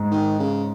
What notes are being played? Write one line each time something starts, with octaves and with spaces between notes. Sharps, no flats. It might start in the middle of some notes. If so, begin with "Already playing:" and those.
Already playing: G#2
D#3
C#3